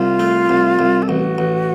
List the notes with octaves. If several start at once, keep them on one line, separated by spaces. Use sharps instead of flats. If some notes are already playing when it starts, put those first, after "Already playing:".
Already playing: C2 F4
A3
C2
C2
A4
A1 F#4
A1